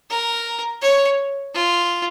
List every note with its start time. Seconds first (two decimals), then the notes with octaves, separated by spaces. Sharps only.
0.10 A#4
0.82 C#5
1.53 F4